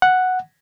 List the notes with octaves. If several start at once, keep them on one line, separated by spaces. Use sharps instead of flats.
F#5